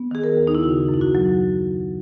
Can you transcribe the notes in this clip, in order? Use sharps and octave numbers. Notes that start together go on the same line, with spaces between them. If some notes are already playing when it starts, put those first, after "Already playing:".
Already playing: B3
D#3 G#4
A#4
D#2
D#4
E4
C#3 F#4
F#2
E4
F#4
F#3